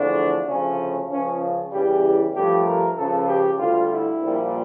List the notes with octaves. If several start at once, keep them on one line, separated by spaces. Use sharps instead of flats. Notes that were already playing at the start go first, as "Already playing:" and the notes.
Already playing: E2 D3 F3 A3 D4
D2 C#3 F3 A3 C#4
C#2 C#3 F3 C#4
E2 C#3 E3 G3 G4
G2 F3 A3 G4
A#4
C#2 C#3 F3 A4
G4
D2 D3 G3 F4
E4
A#1 A#2 G3